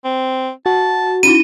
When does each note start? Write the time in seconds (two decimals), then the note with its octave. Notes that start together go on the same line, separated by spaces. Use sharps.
0.05 C4
0.66 F#4 A5
1.23 C#4 D#4 E4 D#7